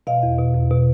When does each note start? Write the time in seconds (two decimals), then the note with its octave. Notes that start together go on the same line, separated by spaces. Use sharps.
0.07 B2 D#5 F5
0.23 E2
0.38 B2
0.54 E2
0.71 B2